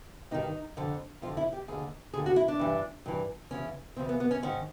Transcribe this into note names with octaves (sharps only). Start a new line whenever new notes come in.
G2 D#3 D#4
F2 D3
F2 D3 F4
E4
G4
D#2 D3 G#4
D#2 D3 G#4
F#4
E4
D4
G2 E3
G2 E3
E2 C#3 E3 C#4
E2 C#3 E3 C4
B3
B3
C#4
G#2 D#3 C#4